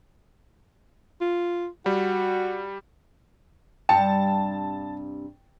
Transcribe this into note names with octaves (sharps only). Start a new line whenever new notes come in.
F4
G3 F#4
G2 C3 G5 A5